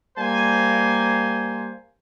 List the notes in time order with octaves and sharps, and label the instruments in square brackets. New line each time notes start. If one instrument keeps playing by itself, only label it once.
[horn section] G3 A#3 C5 G#5